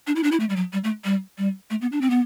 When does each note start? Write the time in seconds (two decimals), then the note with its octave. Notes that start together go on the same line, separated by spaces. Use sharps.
0.07 D4
0.16 E4
0.24 D4
0.32 E4
0.40 A3
0.49 G3
0.56 F#3
0.73 G3
0.84 A3
1.05 G3
1.38 G3
1.70 A3
1.81 B3
1.92 D4
2.01 C4
2.10 B3